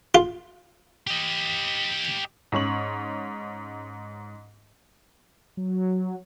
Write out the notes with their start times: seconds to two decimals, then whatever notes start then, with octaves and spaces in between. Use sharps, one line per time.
0.15 F4
1.07 G4 D#5
2.52 G#2 C#4 C#6 F#7
5.57 F#3